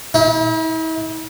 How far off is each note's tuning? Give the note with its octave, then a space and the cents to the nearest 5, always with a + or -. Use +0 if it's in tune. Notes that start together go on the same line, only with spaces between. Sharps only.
E4 -45